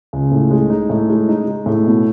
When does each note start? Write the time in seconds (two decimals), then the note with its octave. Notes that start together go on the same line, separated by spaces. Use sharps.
0.13 C#2
0.32 A2
0.51 G#3
0.70 D#4
0.90 A2
1.09 G#3
1.29 D#4
1.48 G#3
1.66 A2
1.86 B2